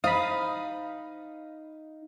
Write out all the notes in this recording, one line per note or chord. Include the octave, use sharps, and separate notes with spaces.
D#4 C5 F5 B5 D#6